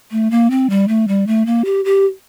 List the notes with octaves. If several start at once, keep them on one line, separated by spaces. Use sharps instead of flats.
A3
A#3
C4
G3
A3
G3
A3
A#3
G4
G4